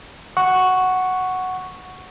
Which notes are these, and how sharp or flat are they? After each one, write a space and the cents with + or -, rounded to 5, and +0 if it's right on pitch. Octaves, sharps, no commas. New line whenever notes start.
F#5 +0 C#6 +0